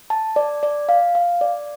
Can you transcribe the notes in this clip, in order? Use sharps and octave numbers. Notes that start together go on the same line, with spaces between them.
A5
D5
D5
F5
F5
D5